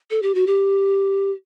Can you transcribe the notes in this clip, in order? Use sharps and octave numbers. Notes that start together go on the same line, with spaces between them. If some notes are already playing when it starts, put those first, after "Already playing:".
A4
G4
F#4
G4